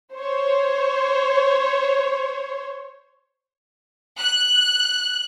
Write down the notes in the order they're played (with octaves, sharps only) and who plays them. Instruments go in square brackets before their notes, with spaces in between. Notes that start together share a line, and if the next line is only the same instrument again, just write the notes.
[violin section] C5 C#5
F#6